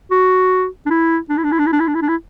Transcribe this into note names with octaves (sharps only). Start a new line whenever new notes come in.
F#4
D4
E4
D4
E4
D4
E4
D4
E4
D4
E4
D4
E4
D4
E4